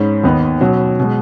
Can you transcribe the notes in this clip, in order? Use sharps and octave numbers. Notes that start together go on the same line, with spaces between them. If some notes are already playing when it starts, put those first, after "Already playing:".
Already playing: G#2 C#4 B5
D#2 D#3 B3 D#4
B2 F#3 C#4
B2 G#3